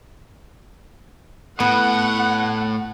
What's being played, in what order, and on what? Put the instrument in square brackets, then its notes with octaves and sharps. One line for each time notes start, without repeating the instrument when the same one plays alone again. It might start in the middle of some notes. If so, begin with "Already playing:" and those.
[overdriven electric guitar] A2 [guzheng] B3 [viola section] F#5